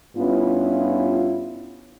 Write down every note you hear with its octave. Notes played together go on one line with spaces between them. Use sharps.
G2 B3 C#4 E4 F4